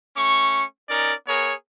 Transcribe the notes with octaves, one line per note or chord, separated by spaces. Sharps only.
A3 C#4 C#6
C#4 D#4 A#4 D5
B3 G#4 A#4 C#5